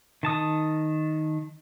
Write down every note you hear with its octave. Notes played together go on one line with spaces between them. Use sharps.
D#3 A5 D#6